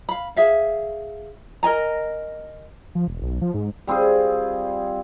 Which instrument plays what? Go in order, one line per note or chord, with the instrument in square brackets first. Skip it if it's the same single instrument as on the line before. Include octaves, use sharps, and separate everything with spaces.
[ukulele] F5 B5
G#4 E5 F5
A#4 D#5 G#5 A#5
[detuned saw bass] F3
E1
B1
F3
G#2
[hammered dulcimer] G3 C4 F4 G#4